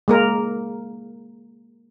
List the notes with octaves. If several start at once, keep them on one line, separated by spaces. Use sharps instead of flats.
G#3 A#3 A#4